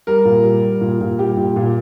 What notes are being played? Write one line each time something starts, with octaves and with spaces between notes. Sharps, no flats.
G3 A#4
A#2
G3
G3
A#2
A#2
G3 G4
A#2
A#2